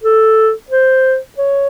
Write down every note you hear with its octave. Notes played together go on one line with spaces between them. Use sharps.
A4
C5
C#5